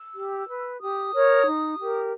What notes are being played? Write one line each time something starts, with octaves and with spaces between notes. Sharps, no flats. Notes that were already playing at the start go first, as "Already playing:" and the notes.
Already playing: E6
G4
B4
G4 D#6
A#4 C#5
D#4
G4 A#4